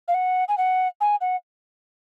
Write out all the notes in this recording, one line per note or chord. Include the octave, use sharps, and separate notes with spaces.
F5
F#5
G#5
F#5
G#5
F#5